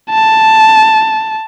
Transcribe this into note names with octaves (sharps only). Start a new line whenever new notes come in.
A5